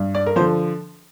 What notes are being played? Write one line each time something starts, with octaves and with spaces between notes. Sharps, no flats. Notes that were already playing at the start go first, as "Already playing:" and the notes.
Already playing: G2
D5
A#4
D3 F3 C5